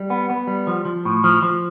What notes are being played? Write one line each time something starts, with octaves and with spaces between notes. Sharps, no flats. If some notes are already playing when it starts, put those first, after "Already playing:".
Already playing: G3
B3
B3
G3
F3
F3
A2
F3
F3